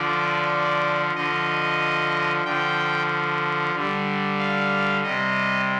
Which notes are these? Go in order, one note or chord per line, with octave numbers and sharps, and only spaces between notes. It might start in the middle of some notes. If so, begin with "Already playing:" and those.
Already playing: D3 F3 D5
D3 F3 D#5
D3 F3 G5
D3 G3
F5
C3 G3 D#5